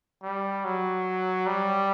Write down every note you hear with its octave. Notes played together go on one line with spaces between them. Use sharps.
G3
F#3
G3